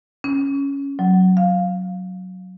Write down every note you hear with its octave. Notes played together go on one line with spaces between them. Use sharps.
C#4
F#3
F5